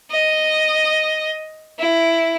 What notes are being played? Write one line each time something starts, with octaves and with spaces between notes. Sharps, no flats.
D#5
E4